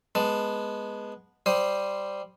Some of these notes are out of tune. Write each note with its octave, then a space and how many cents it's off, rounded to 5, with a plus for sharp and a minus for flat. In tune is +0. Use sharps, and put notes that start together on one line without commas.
G#3 +0 B3 -10 A5 +0
G3 +0 C5 +0 D#6 +15